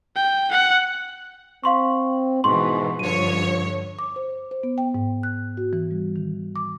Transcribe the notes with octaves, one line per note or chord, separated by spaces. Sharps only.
G5
F#5
C4 F5 C6 C#6
G#2 B2 E3 C6 C#6
G2 D3 F3 C#5 D#7
D6
C5
C5
B3
G5
G#2
F#6
F#4
E3
G3
D#3
D6